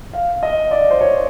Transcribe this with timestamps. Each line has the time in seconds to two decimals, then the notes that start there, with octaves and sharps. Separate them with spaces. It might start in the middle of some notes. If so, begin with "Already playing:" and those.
0.13 F5
0.43 D#5
0.71 D5
0.90 C5
1.01 C#5